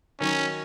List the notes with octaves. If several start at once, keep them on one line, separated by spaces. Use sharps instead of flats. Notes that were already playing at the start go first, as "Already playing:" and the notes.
D#3 F#3 C#4